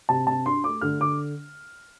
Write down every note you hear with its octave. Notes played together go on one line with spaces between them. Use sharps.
C3 A5
C3 A5
D4 C6
A3 D6
D3 F6
D3 D6